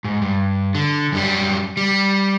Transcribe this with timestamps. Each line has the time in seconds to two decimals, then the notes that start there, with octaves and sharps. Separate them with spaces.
0.04 G#2
0.22 G2
0.75 D3
1.12 F#2 G3
1.77 G3